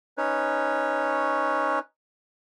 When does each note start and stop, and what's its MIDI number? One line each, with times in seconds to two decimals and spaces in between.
0.18 1.79 61
0.18 1.79 63
0.18 1.79 71
0.18 1.79 73